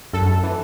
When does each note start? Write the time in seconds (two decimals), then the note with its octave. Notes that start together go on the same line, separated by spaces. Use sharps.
0.13 F#2 A4
0.43 E3